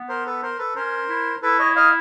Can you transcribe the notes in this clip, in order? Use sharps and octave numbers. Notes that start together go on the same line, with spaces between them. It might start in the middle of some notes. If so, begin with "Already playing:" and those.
Already playing: B3
A#4 C5
A4 B4
A#4 C5
A4 B4
C#4 A#4 C5
E4
E4 A4 B4
C#5 D#5
D#5 F5